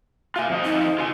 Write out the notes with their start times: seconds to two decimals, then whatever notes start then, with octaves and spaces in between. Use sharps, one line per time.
0.36 F4 E5 G#5
0.50 F2 F3 D#5
0.65 D#4
0.98 F4 G#5